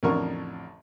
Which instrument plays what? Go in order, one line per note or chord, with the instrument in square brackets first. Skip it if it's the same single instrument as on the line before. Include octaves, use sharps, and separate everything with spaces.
[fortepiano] A1 F2 D3 A#4 C#6